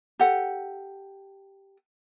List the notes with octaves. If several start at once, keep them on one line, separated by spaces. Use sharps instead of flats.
G4 A4 F#5